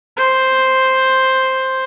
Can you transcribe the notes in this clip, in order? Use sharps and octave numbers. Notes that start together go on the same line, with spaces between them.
C5